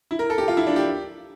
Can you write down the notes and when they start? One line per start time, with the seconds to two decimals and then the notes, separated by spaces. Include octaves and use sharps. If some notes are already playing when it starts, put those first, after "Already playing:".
0.11 E4
0.19 A#4
0.30 A4
0.38 G4
0.48 F4
0.57 E4
0.67 D4
0.76 G4